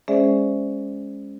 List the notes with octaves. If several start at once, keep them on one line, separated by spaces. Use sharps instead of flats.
G#3 C#4 G#4 C5 D5 E5